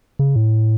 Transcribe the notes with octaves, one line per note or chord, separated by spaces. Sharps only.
C#3
A2